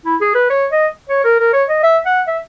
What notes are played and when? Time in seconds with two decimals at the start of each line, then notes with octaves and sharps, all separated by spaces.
0.05 E4
0.21 G#4
0.35 B4
0.50 C#5
0.72 D#5
1.09 C#5
1.24 A#4
1.39 A#4
1.53 C#5
1.69 D#5
1.83 E5
2.06 F#5
2.27 E5